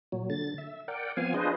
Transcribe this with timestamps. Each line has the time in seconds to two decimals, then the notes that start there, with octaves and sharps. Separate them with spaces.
0.12 A#2 F#3
0.30 D3 A6
0.58 E5
0.88 A#4 D5 F#5 G5
1.17 F3 B3 C4 F5 G#5
1.34 D4 F4 G#4 B4 C5 D#5